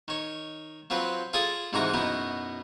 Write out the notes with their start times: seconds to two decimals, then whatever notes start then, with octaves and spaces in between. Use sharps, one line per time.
0.08 D#3 C#5
0.90 F3 F#3 C4 B4
1.33 F4 G#4 A4 D5 G#5 D#6
1.73 G#2 C3 D#3 E3 F#4 A#5
1.94 F#2 B2 B3 D#4 E4